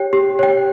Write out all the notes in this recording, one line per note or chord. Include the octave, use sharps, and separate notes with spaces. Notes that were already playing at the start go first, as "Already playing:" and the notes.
Already playing: G4 C#5 G5
G4
C#5 G5